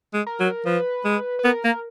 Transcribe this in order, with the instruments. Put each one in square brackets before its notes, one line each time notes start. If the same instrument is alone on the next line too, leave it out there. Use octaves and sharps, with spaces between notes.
[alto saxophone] G#3
[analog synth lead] A#4
[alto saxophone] F#3
[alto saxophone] F3 [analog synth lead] B4
[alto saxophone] G#3
[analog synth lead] B4
[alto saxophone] B3 [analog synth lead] A#4
[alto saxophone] A#3